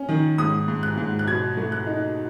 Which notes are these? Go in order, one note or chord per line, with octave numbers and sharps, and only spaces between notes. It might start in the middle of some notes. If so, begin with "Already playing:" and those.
Already playing: C#4
D#3
G#2 D#6
G#2
F#6
G#2
F#6
B2 G#6
A3
F#6
D#4